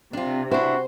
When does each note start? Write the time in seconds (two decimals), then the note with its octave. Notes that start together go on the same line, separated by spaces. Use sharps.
0.13 C3 D4 F4
0.51 D4 E4 F#4 C5